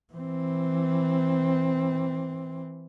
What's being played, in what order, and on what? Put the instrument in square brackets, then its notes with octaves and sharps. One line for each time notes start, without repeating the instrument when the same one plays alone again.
[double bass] E3 C4